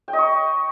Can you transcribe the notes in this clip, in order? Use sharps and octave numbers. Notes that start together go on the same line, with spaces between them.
G5
D#5
C#6